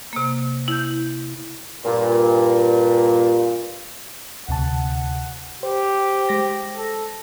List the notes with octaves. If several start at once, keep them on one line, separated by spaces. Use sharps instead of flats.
C3 A#3
E4 G6
G2 A#2
D2 C3 F#5 A5
G4 C5
G#3 C5 A#6
A4